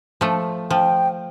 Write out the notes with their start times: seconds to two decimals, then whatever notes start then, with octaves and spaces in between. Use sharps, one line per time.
0.21 F3 A3
0.70 F3 G5